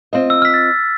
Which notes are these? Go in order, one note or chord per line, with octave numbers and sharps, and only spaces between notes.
C4 F4 D#5
E6
F6 B6
A6